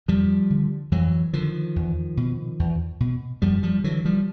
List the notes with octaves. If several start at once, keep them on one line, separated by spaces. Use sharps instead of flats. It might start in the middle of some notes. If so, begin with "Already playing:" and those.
F2 F3 G3
D3
F2 E3 F#3
D3 D#3 F3
E2
B2
E2
B2
F#2 F3 G3
F3 G3
D3 E3 F#3
F3 G3